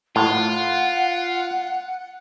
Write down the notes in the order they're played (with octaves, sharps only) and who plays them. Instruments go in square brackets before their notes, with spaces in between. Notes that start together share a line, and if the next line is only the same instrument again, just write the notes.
[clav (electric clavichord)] A2 [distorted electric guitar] F4 [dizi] F#5